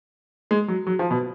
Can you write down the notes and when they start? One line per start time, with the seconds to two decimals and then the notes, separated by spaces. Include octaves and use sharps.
0.51 G#3
0.68 F#3
0.87 F#3
0.99 F3
1.11 B2